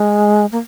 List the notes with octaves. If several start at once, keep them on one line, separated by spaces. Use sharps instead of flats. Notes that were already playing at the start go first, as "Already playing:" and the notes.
Already playing: G#3
A#3